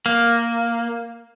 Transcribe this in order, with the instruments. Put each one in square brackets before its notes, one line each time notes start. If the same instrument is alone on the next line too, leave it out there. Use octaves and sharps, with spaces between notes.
[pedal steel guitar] A#3